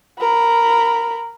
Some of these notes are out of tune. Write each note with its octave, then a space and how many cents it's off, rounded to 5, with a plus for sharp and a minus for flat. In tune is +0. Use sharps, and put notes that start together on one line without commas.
A#4 -5 B5 +0